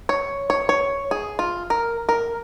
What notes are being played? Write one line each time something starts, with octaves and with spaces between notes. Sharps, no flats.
C#5
C#5
C#5
G#4
F4
A#4
A#4